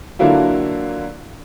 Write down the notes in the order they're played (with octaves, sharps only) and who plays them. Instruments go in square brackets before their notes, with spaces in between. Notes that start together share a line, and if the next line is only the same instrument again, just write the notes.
[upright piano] D3 F#3 A#3 D4 E4 F4